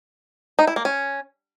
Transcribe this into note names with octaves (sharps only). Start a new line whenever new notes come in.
D#4
E4
A#3
C#4